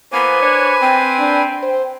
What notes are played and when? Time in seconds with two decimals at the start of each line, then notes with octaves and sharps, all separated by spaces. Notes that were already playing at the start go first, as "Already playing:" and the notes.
0.13 E3 A#3 B3 B4 C5 G#5 D6
0.42 D4 C#5
0.81 C4 G5
1.19 D4
1.63 C5